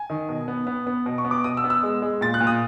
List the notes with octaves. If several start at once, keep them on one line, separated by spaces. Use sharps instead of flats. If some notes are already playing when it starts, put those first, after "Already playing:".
Already playing: G#5
D#3
B2
B3
B3
B3
B2
C#6
B3
D6
B2 D#6
E6
B3
E6
G#3
G#3
A#2 A6
F#6
A#2
D#6